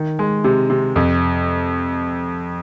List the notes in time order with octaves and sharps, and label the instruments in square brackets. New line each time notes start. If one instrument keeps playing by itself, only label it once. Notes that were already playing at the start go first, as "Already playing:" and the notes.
Already playing: [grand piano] D#3
G#3
C3
C3
F2